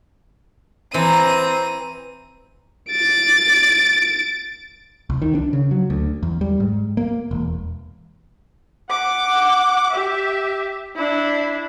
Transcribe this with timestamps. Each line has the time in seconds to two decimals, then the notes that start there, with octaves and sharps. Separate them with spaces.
0.94 E3 C4 A#5 D#7
2.90 A6 D7
5.10 C2
5.22 D#3
5.35 D4
5.53 C#3
5.71 F#3
5.90 D2
6.23 E2
6.41 G3
6.60 G#2
6.97 A#3
7.31 E1
8.90 F#5 D6
9.91 G4 E5
10.96 D4 E4